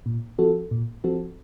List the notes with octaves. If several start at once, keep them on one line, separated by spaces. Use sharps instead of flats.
A#2
F3 C4 F#4 A4
A#2
F3 C4 F#4 A4